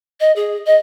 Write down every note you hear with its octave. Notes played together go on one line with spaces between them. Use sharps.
D#5
G#4
D#5